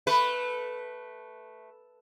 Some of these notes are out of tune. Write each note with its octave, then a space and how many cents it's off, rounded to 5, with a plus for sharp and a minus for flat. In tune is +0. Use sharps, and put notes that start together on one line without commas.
A3 -5 B4 +0